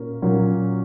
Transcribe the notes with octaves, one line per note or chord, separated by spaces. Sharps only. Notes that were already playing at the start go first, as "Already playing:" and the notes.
Already playing: A#2 A#3 C#4 F#4
A#2 F#3 A#3 C#4 F#4